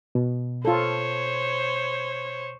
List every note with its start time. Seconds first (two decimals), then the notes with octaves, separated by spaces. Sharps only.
0.15 B2
0.65 F4 A4 C5 C#5